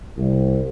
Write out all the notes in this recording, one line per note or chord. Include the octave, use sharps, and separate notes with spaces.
C2